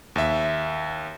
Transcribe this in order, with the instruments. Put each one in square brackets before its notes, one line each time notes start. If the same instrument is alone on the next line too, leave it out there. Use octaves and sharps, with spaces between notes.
[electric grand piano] D#2 E5